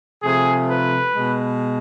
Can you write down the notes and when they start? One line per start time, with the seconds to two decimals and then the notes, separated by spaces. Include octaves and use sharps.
0.22 C3 F3 A3 G#4
0.68 B4
1.14 B2 G#3